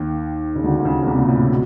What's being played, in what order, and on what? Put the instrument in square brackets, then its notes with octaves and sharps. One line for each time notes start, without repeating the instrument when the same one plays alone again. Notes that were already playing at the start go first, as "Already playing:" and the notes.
Already playing: [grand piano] D#2 D#3
C#3
D2 D3
D3
C#2 C#3
C#3
C2 C3
A#2
A2
B2